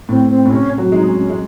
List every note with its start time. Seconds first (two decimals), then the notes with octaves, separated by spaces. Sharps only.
0.09 A2 C4
0.29 C4
0.45 A2
0.50 C3 C#4
0.78 F#3
0.92 G#3 D#4
1.07 C#4
1.20 C#4
1.30 G#3